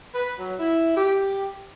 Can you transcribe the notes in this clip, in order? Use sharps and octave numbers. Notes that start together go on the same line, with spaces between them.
B4
F#3
E4
G4